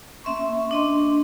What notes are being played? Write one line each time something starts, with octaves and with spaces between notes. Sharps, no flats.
A#3 C#4 E5 C6 C#6
D4 D#5 C6